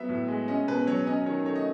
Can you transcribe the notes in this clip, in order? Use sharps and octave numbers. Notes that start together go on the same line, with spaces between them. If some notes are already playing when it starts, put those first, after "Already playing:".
Already playing: F#3 B3 E5
A2
G#3
C#4 D#5
B2 B4
F#3 C#5
C#4 D#5
D#3 C#5
A3 C#5
D#5